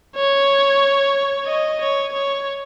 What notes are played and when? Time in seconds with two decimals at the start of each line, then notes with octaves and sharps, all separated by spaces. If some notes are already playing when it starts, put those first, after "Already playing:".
0.16 C#5
1.47 D#5
1.80 C#5
2.13 C#5